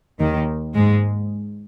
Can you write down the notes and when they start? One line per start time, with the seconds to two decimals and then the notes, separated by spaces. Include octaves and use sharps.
0.19 D#2 D#3
0.75 G#2 G#3